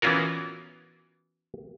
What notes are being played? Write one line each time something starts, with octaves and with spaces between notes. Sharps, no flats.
E3 B3 C#4 F4 F#4 A#4